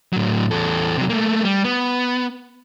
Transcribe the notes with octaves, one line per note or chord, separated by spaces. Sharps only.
A2 F#3
E2 A4
C3 F#3
A3 A#3
G3
B3